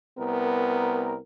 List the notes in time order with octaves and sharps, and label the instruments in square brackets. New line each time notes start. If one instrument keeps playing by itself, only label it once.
[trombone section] C2 A#4 [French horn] B3